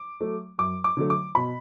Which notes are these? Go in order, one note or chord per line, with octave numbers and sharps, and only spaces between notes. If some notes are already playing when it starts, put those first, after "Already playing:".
Already playing: D6
F#3 A3
F#2 D6
D6
D3 F#3 A3
D6
B2 B5